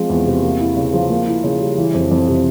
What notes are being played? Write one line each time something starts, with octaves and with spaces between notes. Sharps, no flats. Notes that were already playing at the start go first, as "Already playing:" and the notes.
Already playing: F3 G#3 C4
E2
C3
A#3
E4
C#3
F3
A#3
E4
C#3
G3
E3
F2
F2
C3